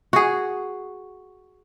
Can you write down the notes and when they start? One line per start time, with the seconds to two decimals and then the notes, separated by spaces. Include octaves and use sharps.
0.13 F#4 G#4